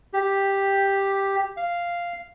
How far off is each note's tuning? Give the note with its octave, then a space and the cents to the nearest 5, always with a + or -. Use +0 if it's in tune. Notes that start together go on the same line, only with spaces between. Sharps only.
G4 +5
F5 -5